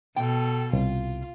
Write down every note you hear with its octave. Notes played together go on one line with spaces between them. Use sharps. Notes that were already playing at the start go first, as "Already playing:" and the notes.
B2 A4 G5
C2 F4